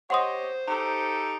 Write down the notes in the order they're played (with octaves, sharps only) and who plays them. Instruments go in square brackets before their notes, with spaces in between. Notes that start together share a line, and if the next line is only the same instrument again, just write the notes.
[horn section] G4 C#5 D#5 [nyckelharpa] C5 [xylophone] F#5 C6 D#6
[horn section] D#4 G4 A4